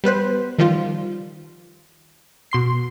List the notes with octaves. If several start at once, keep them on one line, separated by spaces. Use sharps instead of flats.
G3 B3 B4 C5
D#3 F3 G3 F4
B2 C6 C7